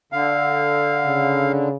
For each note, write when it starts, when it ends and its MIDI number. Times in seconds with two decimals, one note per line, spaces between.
0.12 1.69 50
0.12 1.52 77
1.06 1.77 49